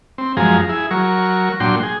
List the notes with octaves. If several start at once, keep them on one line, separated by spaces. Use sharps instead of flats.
C4
F#2 F3 G#3 G#4 A#5
E4 G#4
F#3 A#4 C#6
A#2 F#3 D4 G5 C6
G#4